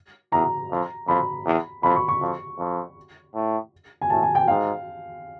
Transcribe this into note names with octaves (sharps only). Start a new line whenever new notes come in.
E2 A#5
F2
F2 B5
E2
F2 B5
C#6
C#6
F2
F2
A2
G#5
A2 A5
G#5
G5
G#2 F5